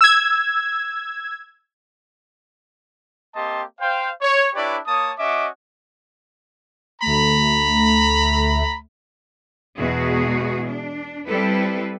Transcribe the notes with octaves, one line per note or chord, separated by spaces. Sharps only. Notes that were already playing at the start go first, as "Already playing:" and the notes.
E6 G#6
A#3 C4 G4 D#5 A5 C6
C5 F5 G5
C#5
D4 E4 G4 B4 C#5 D5
A#3 C#5 A5 D#6
C#4 F#4 D#5 E5 D6
D2 A3 A#5 B5
E2 B2 G#3 F#4 G#4
D4
G3 C4 E4 A4 B4